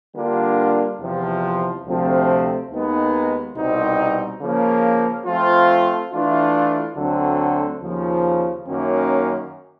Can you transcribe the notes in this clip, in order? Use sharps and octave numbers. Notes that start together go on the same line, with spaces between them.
D3 G3 A#3 D4 F4
E2 C3 F3
D2 C3 F3 A3 C4
D#2 D#3 G#3 B3 D#4
C2 B2 G3 C4 D#4
C#3 F3 A#3
F3 A3 C4 F4
E3 A3 D4 F4
D2 D3 F#3 A3 C4
D#2 C#3 F3
F#2 D#3 F#3 A#3 C#4